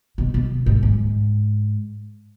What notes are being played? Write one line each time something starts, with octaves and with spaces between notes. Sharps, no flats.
B2
B2
G#2
G#2